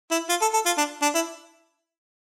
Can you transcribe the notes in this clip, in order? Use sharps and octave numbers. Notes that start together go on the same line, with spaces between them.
E4
F4
A4
A4
F4
D4
D4
E4